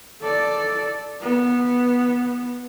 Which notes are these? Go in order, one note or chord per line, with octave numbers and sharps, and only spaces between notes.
A4 D5
B3